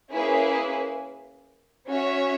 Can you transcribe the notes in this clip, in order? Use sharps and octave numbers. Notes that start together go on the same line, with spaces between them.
A#3 C#4 E4 G#4 B4
C#4 F#4 C#5 E5